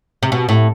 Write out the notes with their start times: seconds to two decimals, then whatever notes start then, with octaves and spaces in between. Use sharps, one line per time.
0.23 C3
0.32 B2
0.49 A2